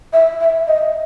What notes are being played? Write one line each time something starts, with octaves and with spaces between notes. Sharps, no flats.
E5
E5
D#5